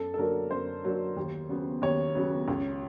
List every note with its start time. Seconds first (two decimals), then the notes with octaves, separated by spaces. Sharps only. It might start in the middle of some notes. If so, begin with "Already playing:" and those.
Already playing: F#2 A4
0.14 A4
0.18 D3 F#3 A#3 A#4
0.51 F#2 C5
0.84 D3 F#3 A#3
1.16 D#2
1.49 C#3 F#3 B3
1.82 D#2 C#5
2.15 C#3 F#3 B3
2.48 C#2